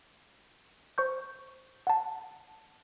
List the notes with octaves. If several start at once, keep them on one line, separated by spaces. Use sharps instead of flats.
C5 C#6 G6
F#5 A5